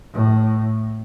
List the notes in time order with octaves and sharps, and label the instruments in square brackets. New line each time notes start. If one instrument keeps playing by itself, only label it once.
[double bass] A2